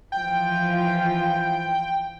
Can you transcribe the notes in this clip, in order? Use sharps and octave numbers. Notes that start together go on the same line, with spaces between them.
E3 F3 F4 G5